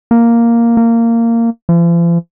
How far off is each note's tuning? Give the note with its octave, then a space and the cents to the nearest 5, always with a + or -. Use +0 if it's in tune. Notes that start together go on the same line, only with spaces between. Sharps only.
A#3 +0
A#3 -15
F3 -45